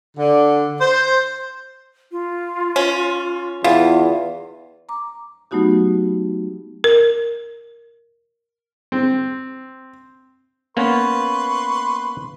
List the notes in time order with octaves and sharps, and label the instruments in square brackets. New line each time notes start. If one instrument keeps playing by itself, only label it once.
[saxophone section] D3
C5
[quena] F4
[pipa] C#4
[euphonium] E2 [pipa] E3 [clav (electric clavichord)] F4
[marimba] A#5 D6
F#3 A3 B3 D#4 F#4 G4
A#4
[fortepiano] C4
[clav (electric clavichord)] A#3 B3 C#4 [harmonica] B4 C6 C#6